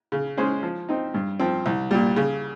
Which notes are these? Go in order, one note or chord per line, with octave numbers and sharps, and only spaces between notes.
C#3
G#3 C#4 G#4 C5
F3
C4 D#4
G2
F3 C4
C2
A#2 G3
C#3